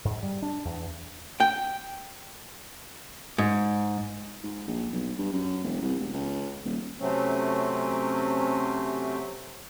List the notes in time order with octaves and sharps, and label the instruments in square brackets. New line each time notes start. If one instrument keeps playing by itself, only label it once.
[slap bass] G#2
G3
D4
E2
[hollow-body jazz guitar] G5
G#2
[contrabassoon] G#2
A#1
B1
G2
F#2
E1
C2
E1
C#2
D#1
[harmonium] C3 F#3 A3 C4 C#4